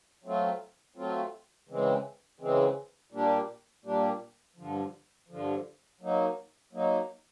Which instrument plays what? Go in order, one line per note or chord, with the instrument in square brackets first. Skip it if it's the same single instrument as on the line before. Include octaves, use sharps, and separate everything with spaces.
[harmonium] F#3 A3 C4 F4
F#3 A3 C4 F4
C#3 E3 G#3 C4
C#3 E3 G#3 C4
A#2 G3 A#3 D4 G4
A#2 G3 A#3 D4 G4
G2 D3 F3
G2 D3 F3
F#3 A#3 D#4
F#3 A#3 D#4